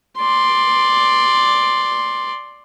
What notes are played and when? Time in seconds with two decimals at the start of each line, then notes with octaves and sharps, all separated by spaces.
0.19 D5 C6